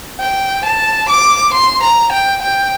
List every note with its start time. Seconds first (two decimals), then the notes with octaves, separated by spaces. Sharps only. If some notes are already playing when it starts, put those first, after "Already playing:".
0.20 G5
0.65 A5
1.09 D6
1.53 C6
1.82 A#5
2.12 G5
2.42 G5